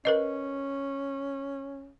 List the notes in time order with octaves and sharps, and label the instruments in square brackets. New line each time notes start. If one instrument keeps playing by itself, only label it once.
[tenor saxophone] C#4 [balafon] A#4 B4 D#5